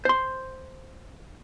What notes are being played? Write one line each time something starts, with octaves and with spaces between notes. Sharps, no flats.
C5 C6